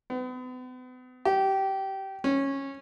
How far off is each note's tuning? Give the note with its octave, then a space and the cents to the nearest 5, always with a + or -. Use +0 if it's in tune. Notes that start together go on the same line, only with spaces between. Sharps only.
B3 +40
G4 -20
C#4 -15